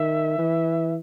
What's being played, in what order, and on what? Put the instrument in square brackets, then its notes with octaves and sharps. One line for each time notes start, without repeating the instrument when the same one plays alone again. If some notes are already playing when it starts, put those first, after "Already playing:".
Already playing: [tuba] D#3 [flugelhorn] E5
[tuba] E3